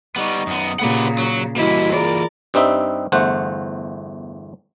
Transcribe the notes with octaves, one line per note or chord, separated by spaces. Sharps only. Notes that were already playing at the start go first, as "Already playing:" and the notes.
G3 B3 D#4 D#5 C#6
F#2 B3 D#6
A#2 C#3 G4 B4 F#5
F#3
E3 G3 A#3 E4 F#4 D#5
F4 G#4 A#4 D5 B5
G2 G3 C4 D#4 E5
G1 E2 A3 C5 F#5